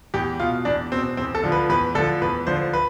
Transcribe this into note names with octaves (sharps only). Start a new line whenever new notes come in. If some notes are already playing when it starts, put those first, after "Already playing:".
E2 G4
B2 F4
E2 D4
B2 C4
E2 C4
A4
D3 F3
B4
E2 B4
D3 F3 A4
E2 B4
D3 F3 C5
B4